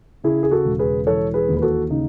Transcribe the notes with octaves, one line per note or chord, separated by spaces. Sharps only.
C#3 E4 G#4
G#4
F#4 A4
E1
G#4 B4
E3 A4 C#5
G#4 B4
D#2
B4
F#4 A4
C#3 D#4